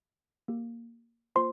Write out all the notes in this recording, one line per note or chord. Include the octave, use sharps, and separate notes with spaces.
A#3 G4
A#3 F4 C5 C6